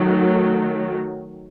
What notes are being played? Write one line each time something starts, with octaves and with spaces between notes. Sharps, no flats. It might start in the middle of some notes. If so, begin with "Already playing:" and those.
Already playing: D#3 F#3 A3